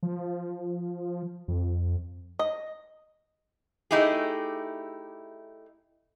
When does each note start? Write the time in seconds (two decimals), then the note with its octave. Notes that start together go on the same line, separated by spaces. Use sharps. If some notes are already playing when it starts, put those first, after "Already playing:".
0.03 F3
1.48 F2
2.39 D#5
3.91 A3 D#4 E4 G4 G#4